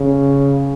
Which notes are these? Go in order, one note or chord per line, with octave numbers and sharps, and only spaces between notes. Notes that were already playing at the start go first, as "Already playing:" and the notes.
Already playing: C#3